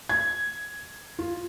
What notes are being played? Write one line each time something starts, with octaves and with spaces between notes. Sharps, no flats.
G#6
F4